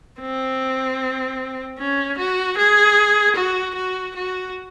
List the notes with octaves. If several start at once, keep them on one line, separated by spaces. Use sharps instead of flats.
C4
C#4
F#4
G#4
F#4
F#4
F#4